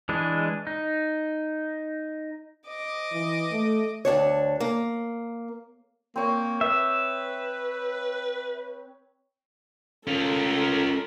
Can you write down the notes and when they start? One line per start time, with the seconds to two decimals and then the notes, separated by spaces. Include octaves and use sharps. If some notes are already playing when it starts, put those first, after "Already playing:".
0.09 E3 G#3 D4
0.67 D#4
2.67 D#5 D6
3.13 E3
3.52 A3
4.05 D2 C3 D4 C#5
4.60 A#3
6.16 A#3 C4 C#5
6.61 B4 E5
10.07 C#4 F4 A4 A#4